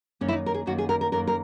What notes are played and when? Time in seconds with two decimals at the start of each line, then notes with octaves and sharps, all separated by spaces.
0.21 F#2 D#3 A#3 C#4
0.28 E4
0.33 D#4
0.46 A#4
0.54 G#4
0.66 F#2 D#3 A#3 F#4
0.78 G#4
0.89 A#4
1.01 A#4
1.12 F#2 D#3 A#3 A#4
1.27 A#4